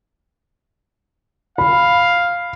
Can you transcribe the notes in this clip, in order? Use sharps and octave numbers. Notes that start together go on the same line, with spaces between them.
F5 B5